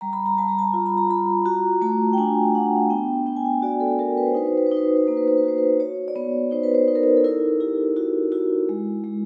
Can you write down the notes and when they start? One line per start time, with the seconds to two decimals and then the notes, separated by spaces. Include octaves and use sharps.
0.01 G3 A#5
0.13 B5
0.26 A#5
0.38 G3 A5
0.48 A#5
0.59 A5
0.73 F4 A#5
0.86 B5
0.98 A#5
1.09 F4 B5
1.46 F#4 A#5
1.82 A3 A5
2.13 G5
2.18 D4 G#5
2.55 D4 F#5
2.90 B3 G5
3.26 B3 G5
3.37 G#5
3.46 G5
3.62 F#4 D5
3.80 A4
3.99 F#4 A#4
4.18 B4
4.27 C5
4.34 D#4 B4
4.47 C5
4.57 B4
4.67 D#4 C5
4.77 B4
4.88 C5
4.97 B4
5.07 A#3 C5
5.17 B4
5.28 C5
5.38 B4
5.43 F#4
5.48 C5
5.58 B4
5.80 F#4 C#5
6.08 D5
6.15 B3 C#5
6.51 D#4 C5
6.63 B4
6.74 C5
6.88 D#4 B4
6.96 A#4
7.03 B4
7.17 A4
7.24 E4 A#4
7.60 E4 G4
7.97 E4 F#4
8.32 E4 F#4
8.69 G#3
9.04 G#3